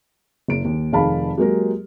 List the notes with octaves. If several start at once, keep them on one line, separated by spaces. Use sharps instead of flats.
F#1 D7
D#2
F1 D#3 G#4 F5 A5 B5
F#3 G#3 A#3 G4 G#4 A#4